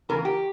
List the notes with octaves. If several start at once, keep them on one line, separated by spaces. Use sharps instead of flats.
E2 C#3 A#3 A#4
G4